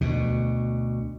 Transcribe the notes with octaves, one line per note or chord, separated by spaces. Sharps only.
D2 B2